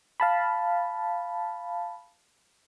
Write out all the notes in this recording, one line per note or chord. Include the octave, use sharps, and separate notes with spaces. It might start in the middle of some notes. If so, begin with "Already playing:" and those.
F5 A5 B5